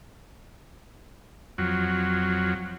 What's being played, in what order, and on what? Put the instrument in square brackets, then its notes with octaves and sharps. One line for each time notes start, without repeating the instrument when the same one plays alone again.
[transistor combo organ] F2 F#3